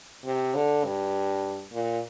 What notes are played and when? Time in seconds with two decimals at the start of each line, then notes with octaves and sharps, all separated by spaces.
0.24 C3
0.54 D3
0.84 G2
1.72 A#2